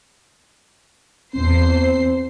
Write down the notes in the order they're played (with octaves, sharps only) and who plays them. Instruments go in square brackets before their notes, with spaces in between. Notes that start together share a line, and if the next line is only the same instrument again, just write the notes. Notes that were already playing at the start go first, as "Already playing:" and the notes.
[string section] E2 C5 C7 [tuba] C4